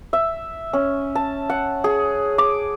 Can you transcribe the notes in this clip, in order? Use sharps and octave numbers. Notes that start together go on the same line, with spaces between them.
E5
C#4
A5
F#5
G#4
D6